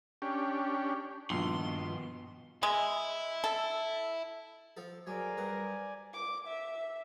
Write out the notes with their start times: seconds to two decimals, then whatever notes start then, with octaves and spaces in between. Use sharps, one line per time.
0.22 C#4 D4 G4
1.30 A#1 G2 B2 D#3 F4 C6
2.63 G#3 E4
3.44 A4
4.77 F3 A4
5.07 F#3 G#4 A#4 C5 D5 G#5
5.37 G2 F#5
6.13 D6
6.47 E5